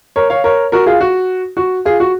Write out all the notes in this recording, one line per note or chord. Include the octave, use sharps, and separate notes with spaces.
A#4 C#5
C#5 F5
A#4 C#5
F#4 A#4
F4 G#4
F#4
F#4
F4 G#4
F#4